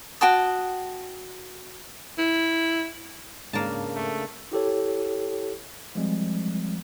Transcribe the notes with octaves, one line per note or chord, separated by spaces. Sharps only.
F#4 G5 A5 D#6
E4
G#2 C#3 A#3 D4 A5 F6
A3
E4 G4 A4 C#5
F3 G3 G#3 C4